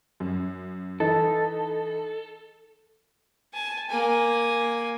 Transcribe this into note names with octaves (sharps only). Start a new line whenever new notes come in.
F#2
E3 D#4 A4
G#5 A5
A#3 G#5